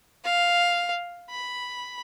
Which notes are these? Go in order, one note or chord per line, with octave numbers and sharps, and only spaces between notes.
F5
B5